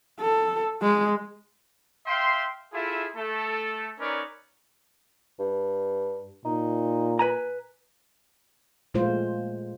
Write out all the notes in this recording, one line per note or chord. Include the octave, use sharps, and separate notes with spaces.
A4
G#3
E5 F5 G5 C6
E4 F4 G#4 A4 E5
A3 A4
C#4 D#4 A#4 B4 C#5 D5
G2
A#2 D#4
B4 G#5 A#5
A#2 G#3 A3 F4 C5